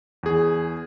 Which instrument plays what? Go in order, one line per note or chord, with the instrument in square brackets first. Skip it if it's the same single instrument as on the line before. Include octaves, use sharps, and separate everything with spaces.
[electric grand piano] E2 G#4